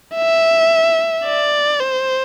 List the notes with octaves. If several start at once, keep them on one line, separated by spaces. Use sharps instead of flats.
E5
D5
C5